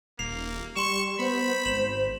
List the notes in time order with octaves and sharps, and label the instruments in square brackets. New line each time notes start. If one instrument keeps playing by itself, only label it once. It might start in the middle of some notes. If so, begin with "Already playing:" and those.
[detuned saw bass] D#1 [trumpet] A#3 [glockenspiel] C7 F7
[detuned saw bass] G3 [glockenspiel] C6 E7 [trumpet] C#6
[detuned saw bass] B3 [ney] C5 [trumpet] B5
[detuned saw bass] G#1 [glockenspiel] E7 F#7